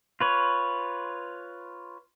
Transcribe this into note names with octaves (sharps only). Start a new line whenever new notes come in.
F4 B4 C#5